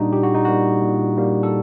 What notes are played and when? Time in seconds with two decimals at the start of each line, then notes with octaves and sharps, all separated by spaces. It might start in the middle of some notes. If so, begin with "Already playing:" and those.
Already playing: A#2 G3 A#3 D4 D#4 F#4
0.13 A#2 G4
0.23 F#4
0.35 D#4
0.45 G3 A#3 F#4
0.83 A#2
1.17 G3 A#3
1.43 A4